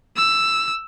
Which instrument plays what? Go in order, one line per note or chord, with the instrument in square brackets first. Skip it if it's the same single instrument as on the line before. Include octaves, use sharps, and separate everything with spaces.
[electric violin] E6